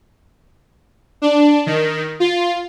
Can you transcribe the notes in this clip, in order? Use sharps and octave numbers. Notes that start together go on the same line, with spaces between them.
D4
D#3
F4